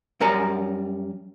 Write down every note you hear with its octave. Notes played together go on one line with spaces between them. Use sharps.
F#2 G3 A#4 G#5 A#5